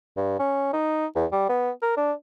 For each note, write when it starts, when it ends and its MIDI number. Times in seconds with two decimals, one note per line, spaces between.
0.17 0.35 43
0.39 0.70 61
0.73 1.06 63
1.16 1.26 40
1.32 1.48 55
1.49 1.71 59
1.82 1.94 70
1.97 2.13 62